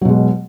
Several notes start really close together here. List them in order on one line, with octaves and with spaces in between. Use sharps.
F#3 B2 G#3